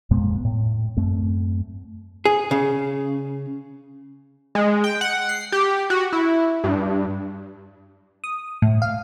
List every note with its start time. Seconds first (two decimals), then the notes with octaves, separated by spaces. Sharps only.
0.11 F2 A#2 G#3 B3
0.45 A2
0.97 F#2 A3 C4
2.25 G#4
2.51 C#3
4.55 G#3
4.84 G5
5.01 F#5
5.29 C7
5.52 G4
5.90 F#4
6.13 E4
6.64 G2
8.24 D#6
8.62 A2
8.82 F5